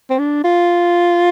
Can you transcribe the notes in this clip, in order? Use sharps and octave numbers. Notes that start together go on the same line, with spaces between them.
C4
D4
F4